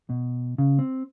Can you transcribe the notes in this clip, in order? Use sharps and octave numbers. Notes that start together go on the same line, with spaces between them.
B2
C#3
C4